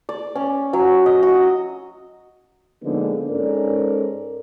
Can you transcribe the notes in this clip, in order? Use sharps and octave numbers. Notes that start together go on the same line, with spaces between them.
D5
C#4
F#3
D#5
F#4
D3 F3 G#3 A#3 B3 D#4
G#2 C#4 A4 A#4 D5